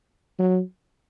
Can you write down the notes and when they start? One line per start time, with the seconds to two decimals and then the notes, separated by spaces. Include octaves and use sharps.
0.39 F#3